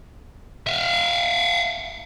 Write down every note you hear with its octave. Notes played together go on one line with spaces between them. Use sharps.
E5 F5